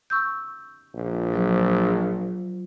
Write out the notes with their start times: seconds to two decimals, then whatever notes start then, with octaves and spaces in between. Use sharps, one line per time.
0.10 C#6 E6 G6
0.94 A#1
1.33 F#3 F4 C5